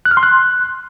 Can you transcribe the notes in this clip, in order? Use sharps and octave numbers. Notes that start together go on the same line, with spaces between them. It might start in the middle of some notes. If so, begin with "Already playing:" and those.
F#6
F6
C6
F#6